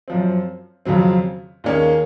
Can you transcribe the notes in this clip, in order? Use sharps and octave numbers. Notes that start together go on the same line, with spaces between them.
F#2 F3 C4
F2 C#3 F#3 C4
D#2 D#3 A#3 C#4 G#4